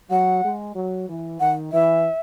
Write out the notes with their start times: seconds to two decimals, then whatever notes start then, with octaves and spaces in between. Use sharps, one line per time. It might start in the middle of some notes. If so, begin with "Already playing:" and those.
0.10 F#3 F#5
0.44 G#3
0.75 F#3
1.09 E3
1.40 D#3 F#5
1.73 E3 E5